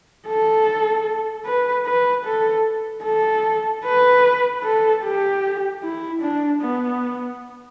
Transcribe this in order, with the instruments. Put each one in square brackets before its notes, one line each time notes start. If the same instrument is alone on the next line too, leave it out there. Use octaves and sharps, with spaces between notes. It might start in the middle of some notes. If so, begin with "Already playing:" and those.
[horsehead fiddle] A4
B4
B4
A4
A4
B4
A4
G4
E4
D4
B3